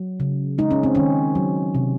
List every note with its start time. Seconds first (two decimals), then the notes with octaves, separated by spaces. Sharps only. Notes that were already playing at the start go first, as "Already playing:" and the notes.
Already playing: F#3
0.20 C#3
0.58 G#3 D#4
0.71 C#4
0.83 C4
0.95 D#3 C#4
1.35 F#3
1.75 C3